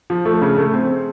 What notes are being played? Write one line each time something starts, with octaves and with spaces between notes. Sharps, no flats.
F3
A3
C#3
A3
C4